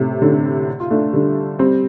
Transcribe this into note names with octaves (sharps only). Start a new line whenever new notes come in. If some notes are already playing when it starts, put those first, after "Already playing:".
Already playing: A2 C3
A2 D3
F4
A3 D4
D3 G3
G3 C4